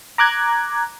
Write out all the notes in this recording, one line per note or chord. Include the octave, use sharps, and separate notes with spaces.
A#5 D6 F#6 G#6